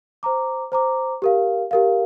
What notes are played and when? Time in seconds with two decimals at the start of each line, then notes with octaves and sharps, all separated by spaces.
0.23 C5 A#5 D6
0.72 C5 A#5 D6
1.22 G4 A#4 F5
1.71 G4 A#4 F5